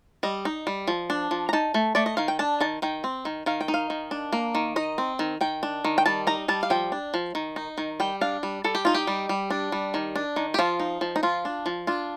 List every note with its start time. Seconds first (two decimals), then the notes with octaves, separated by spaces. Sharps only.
0.23 G3 D#5
0.45 D#4
0.67 G3
0.88 F3
1.10 D4
1.31 F3
1.49 A#5
1.53 D#4 A5
1.74 A3
1.95 A3 D5
2.06 D#5
2.17 D#3 F5
2.28 G5
2.39 D4 A5
2.61 D#3 A5
2.82 D#3 G5
3.04 C4
3.25 D#3
3.46 D#3 F5
3.61 G5
3.68 D#4
3.74 F5
3.90 D#3
4.11 D4
4.33 A#3
4.55 D#3
4.76 D#4 D#5
4.98 C4
5.19 D#3
5.41 D#3 G5
5.63 D4
5.85 D#3
5.98 G5
6.06 G3 A5
6.27 D#4 A#5
6.48 G3 A5
6.63 F5
6.70 F3 G5
6.92 D4
7.14 F3
7.35 D#3
7.56 D#4
7.78 D#3
8.00 G3 G5
8.21 D4 F5
8.43 G3
8.64 G3 A4
8.75 G4
8.85 D#4 F4
8.95 G4
9.07 G3
9.29 G3
9.50 D4
9.72 G3
9.94 D#3
10.16 D4
10.36 D#3
10.54 G4
10.59 F3 F4
10.80 D#4
11.01 F3
11.16 D#4
11.23 F3 F4
11.45 D4
11.66 F3
11.87 D4 F4